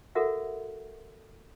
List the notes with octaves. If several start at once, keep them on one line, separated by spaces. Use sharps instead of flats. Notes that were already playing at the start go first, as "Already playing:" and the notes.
F#4 A4 A#4 E5 F#5